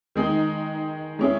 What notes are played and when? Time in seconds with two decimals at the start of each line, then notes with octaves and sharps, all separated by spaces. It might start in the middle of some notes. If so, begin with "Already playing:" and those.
0.16 D#3 G#3 D#4 G#4
1.19 G#3 C#4 E4 G#4